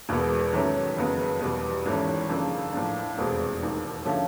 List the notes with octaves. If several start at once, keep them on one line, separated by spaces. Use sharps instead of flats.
E1 E2 B2 G#3 B3
G#2 D#3 F#3 A3 C#4
F#1 F2 C#3 F#3 B3
E2 B2 G3 B3
G#1 G#2 E3 A3 C#4
F#2 C#3 F3 A#3 D4
A2 F3 A#3 D4
F1 E2 B2 G#3 C4
E1 D#2 D#3
D3 F3 A3 C#4